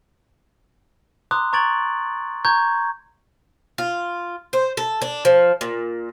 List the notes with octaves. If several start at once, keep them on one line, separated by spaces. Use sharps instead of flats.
A#5 C6 D6 D#6 F#6
A#5 C#6 G#6 A6 D7 F#7
A#5 C#6 G6 G#6
F4
C5
A4
D4
F3
A#2